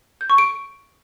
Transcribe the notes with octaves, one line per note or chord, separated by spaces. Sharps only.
G6
C#6
D7